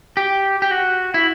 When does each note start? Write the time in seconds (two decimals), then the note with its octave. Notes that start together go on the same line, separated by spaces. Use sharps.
0.17 G4
0.62 G4
0.71 F#4
1.14 E4